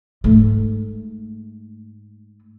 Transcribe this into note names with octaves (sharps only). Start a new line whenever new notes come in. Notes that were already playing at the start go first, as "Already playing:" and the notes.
G#2 A3